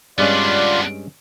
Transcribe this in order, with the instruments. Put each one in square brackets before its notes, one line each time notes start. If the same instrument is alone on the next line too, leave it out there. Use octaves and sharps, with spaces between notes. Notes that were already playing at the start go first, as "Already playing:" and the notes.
[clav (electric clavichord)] G2 G#3 C#4 [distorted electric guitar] B3 D4 [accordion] F4 D5